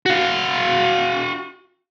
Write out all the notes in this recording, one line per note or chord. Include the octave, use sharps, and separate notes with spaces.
F#4 F5